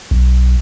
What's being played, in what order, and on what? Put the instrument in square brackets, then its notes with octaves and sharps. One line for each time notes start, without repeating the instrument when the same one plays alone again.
[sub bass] B1